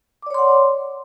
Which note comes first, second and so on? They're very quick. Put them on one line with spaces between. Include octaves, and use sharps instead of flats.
D6 D5 C#5 C6 F#5